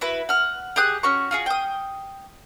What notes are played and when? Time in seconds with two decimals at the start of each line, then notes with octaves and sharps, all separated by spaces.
0.01 E4 F#4 B4
0.29 F#5 F6
0.76 G4 G#4 D#6 F#6
1.03 C#4 F#4 C#6
1.31 F4 F#4 G#4
1.46 G5 D#6